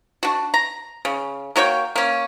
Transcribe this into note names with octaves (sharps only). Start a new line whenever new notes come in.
D4 F#4
A#5
C#3
A#3 F#4 C#5 G5
A#3 C#4